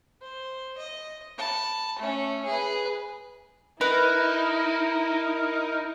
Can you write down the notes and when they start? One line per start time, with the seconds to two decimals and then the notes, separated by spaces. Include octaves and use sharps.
0.21 C5
0.78 D#5
1.38 A5 B5
1.99 A3 C#4
2.46 G#4 B4
3.81 D#4 E4 A#4 B4